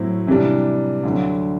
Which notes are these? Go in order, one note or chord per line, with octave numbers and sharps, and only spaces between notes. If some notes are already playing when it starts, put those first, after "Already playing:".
Already playing: A2 F#3 C4 E4
C3 E3 G3 D4
D2 D3 F#3